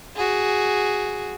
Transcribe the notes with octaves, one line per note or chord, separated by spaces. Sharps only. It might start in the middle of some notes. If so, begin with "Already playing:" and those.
F#4 G#4